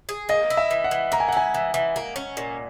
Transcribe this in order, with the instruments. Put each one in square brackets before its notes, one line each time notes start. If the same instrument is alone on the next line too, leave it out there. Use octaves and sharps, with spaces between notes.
[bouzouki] G#4
[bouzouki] A#3 [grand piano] D#5
[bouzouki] E4
[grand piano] E5
[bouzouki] E3
[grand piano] F#5
[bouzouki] E3
[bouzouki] A#3 [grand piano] A#5
[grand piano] G#5
F#5
[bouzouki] E4 [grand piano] G#5
[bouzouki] E3
E3
A#3
C#4
A#2